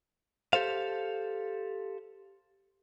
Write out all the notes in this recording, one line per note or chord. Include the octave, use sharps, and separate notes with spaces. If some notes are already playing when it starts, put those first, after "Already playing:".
G4 A4 C5 F5